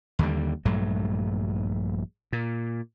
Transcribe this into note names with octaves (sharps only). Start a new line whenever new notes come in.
D#2 D3 G3
A#1 G2 F#3 A3
A#2